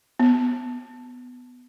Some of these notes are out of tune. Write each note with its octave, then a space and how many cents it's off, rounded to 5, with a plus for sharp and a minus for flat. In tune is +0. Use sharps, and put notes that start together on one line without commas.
B3 +10